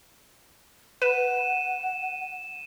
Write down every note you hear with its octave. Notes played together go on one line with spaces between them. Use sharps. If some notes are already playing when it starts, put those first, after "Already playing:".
B4 F#5 D#7 E7